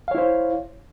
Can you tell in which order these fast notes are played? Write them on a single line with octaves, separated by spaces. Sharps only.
F5 C#5 E4 C5